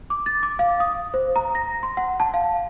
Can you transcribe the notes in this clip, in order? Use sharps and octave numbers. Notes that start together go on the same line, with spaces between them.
D6
A6
D6
F5
D#6
C5
A#5
A#6
C6
F#5
A5
F5